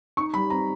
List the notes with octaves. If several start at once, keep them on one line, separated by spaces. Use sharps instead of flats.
D#4 C#6
G3 B5
C4 A#5